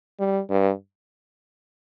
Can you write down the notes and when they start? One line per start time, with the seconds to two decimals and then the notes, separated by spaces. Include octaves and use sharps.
0.20 G3
0.50 G2